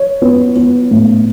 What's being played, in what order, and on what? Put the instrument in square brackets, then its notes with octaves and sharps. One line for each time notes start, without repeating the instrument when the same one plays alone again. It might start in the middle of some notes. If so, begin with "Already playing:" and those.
Already playing: [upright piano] C#5
B3
B3
A2